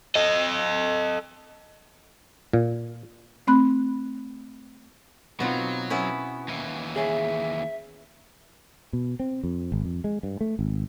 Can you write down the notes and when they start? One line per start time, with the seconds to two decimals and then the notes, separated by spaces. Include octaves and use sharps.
0.15 A4 D#5
2.53 A#2
3.47 A3 C4 B5 F#6
5.40 B2 F#3 B3 C4 D#4 F4
5.90 B3 C#4 E4
6.48 D#2 E3
6.96 G#4 C#5 E5 G#5
8.93 B2
9.20 C4
9.44 F2
9.72 G#1
9.85 F2
10.04 G#3
10.23 G2
10.41 A3
10.59 G#1